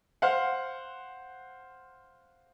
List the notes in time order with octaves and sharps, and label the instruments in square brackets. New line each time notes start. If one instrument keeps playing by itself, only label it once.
[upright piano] C5 F5 F#5